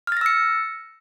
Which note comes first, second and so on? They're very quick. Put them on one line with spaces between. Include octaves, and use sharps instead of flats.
F6 A6 A#6 E6 C#7